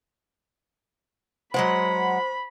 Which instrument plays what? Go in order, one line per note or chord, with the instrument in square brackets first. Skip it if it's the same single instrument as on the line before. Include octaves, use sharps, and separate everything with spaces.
[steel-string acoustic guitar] F#3 G#3 F#5 [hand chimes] C5 [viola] B5